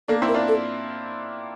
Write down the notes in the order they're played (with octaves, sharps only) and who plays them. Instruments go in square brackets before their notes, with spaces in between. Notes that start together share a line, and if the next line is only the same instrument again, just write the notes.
[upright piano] A#3 D4 [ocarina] A4
[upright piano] C4 E4
[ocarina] A#4
[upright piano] D4 F4
[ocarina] A4